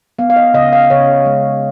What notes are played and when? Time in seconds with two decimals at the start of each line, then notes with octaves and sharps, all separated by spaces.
0.19 B3 F5
0.30 F5
0.36 D#5
0.54 C#3 D#5
0.73 F5
0.90 C#3 C#5
1.26 G#3